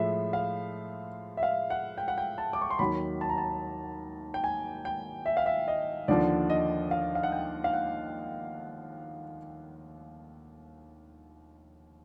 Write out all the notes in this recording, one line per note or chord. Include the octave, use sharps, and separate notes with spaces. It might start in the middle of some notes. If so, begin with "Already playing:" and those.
Already playing: A2 F3 G#3 E5
F5
E5
F5
F#5
G5
F#5
G5
A5
D6
C#6
C6
D#2 D#3 F#3 B5
A5
A#5
A5
G5
G#5
G5
E5
F5
E5
D#5
D#2 D3 F3 D5
D#5
F5
F5
F#5
G5
F5
F#5